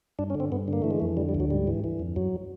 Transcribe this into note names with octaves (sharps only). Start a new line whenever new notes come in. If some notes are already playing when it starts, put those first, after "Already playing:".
G2 D4
C#4
D3
C4
G2 B3
D3 A#3
E3 A3
G#3
F2 A3
D3 G3
G3
D2
F#3
G#2 G3
E3
E3
F2
F#2 F#3